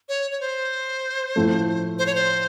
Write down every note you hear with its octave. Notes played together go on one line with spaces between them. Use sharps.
C#5
C#5
C5
A2 F3 A3
C5
C#5
C5